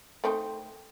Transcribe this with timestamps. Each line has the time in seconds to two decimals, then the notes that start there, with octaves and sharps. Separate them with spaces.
0.24 A3 C4 D#4